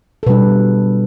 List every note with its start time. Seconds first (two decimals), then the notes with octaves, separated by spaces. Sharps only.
0.23 A4
0.26 B2 G3 D4 B4